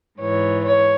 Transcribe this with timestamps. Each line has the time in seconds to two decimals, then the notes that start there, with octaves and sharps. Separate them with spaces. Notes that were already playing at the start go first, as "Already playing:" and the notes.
0.20 G#2 E3 C#5
0.64 C#5